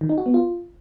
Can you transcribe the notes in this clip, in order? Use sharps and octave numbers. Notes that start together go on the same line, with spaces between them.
D#3
D#4
F#4
B3
F4